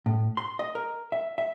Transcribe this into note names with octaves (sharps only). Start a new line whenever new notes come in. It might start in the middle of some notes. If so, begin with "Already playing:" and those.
A2
C6
D#5
A#4
E5
E5